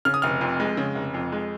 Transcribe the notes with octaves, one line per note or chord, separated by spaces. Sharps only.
C#3 F6
D#6
F1 F6
F2
G#3
C#3
F1
F2
G#3